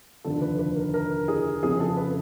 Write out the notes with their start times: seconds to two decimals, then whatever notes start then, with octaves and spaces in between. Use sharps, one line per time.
0.24 F1 D#2 D3 F3 A4
0.42 B4
0.59 B4
0.77 A#4
0.94 A#4
1.28 G#4
1.62 F2 C#3 F3 G#4
1.80 A4
1.97 B4